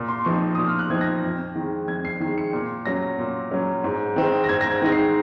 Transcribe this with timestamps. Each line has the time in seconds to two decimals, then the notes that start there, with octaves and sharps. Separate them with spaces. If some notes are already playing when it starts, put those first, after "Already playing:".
Already playing: A#2
0.09 C6
0.25 F3 C4 D#4 C#6
0.55 A#2 D#6
0.67 F6
0.79 F#6
0.90 F3 C4 D#4 G#6
1.01 A#6
1.23 F2
1.56 D#3 G#3
1.88 F2 G#6
2.05 C7
2.20 D#3 C7
2.26 G#3
2.38 C#7
2.53 A#2
2.86 F#3 C#4 A#6
3.19 A#2
3.51 F#3 C#4
3.84 G#2
4.16 D#3 G#3 C4 D#4
4.44 A#6
4.49 G#2 G#6
4.61 A#6
4.71 G#6
4.82 D#3 G#3 C4 D#4 A#6
4.92 C7